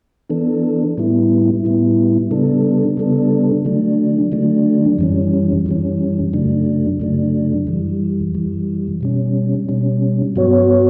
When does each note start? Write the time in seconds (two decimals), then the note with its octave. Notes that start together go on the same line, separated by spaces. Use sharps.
0.30 E3 B3 D4 A4
0.98 A2 G3 B3 E4
1.64 A2 G3 B3 E4
2.31 C#3 G3 B3 D4 A4
2.97 C#3 G3 B3 D4 A4
3.65 D3 F#3 A3 D4
4.32 D3 F#3 A3 D4
4.99 F#2 E3 G3 C#4
5.66 F#2 E3 G3 C#4
6.33 F#2 C#3 F#3 A3 D4
7.00 F#2 C#3 F#3 A3 D4
7.67 F#2 E3 G3
8.34 F#2 E3 G3
9.01 B2 G3 C#4
9.69 B2 G3 C#4
10.36 G2 F#3 B3 F#4 C#5